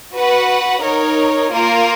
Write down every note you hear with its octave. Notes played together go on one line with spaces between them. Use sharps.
F#4 B4 F#5
D#4 A#4 C#5
A#3 F4 A#4